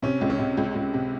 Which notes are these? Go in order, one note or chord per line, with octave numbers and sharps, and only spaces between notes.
C3 C#4
C#2
C#4
C3
C#2
C#2
C3